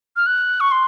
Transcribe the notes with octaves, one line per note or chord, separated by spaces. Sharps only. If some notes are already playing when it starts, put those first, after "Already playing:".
F6
F#6
C#6
C6